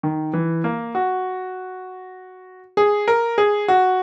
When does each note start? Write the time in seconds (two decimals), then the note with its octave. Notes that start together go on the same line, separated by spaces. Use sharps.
0.03 D#3
0.33 E3
0.64 A#3
0.95 F#4
2.77 G#4
3.08 A#4
3.38 G#4
3.68 F#4